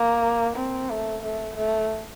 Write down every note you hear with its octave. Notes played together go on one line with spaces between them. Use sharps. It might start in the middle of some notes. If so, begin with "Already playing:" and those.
Already playing: A#3
C4
A3
A3
A3